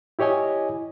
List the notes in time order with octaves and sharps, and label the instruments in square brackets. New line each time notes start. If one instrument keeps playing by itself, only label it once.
[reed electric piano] E4 G4 C#5 D#5 G#5